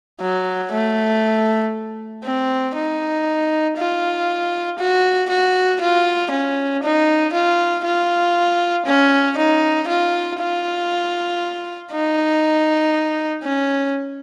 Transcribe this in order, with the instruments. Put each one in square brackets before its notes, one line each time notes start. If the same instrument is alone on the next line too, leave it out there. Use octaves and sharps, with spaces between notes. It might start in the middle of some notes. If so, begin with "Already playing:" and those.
[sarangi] F#3
A3
C4
D#4
F4
F#4
F#4
F4
C#4
D#4
F4
F4
C#4
D#4
F4
F4
D#4
C#4